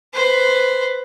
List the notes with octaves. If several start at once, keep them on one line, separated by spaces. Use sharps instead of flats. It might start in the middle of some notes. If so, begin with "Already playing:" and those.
B4 C5